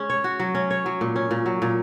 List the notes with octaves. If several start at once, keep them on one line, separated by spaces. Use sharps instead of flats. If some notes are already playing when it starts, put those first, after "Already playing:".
Already playing: G#3 C#4
C#5
F#4
F#3
C#4
C#5
F#3
A#2
C#4
A#2
F#3
A#2